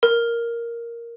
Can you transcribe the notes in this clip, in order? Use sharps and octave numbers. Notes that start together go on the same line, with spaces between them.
A#4